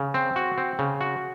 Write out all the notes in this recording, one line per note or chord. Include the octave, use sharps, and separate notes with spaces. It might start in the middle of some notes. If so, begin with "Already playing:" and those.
Already playing: C#3
C4
F#4
C4
C#3
F#4